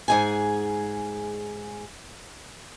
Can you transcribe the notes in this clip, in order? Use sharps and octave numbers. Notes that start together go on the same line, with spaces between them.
G#2 G#4 G#5